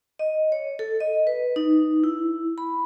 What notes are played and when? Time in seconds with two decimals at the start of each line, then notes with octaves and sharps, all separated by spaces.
0.19 D#5
0.52 C#5
0.79 A4
1.00 D#5
1.27 B4
1.56 D#4
2.04 E4
2.58 B5